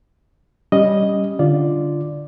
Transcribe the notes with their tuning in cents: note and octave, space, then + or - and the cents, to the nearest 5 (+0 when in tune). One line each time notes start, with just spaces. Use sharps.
G3 +0 C#4 +0 D#5 +0
D3 +0 F4 -10 D5 +0